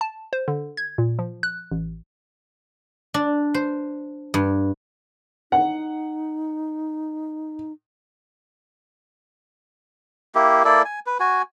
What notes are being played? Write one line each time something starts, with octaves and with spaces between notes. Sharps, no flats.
A5
C5
D3
G#6
A#2
F3
F#6
A1
D4
C5
G2
D#4 F#5
A#3 E4 G4
A#3 E4 A4 D5
G#5
B4
F#4 G#5